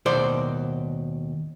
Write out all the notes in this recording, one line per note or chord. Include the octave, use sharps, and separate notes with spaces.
D#2 B2 C5 D5 C6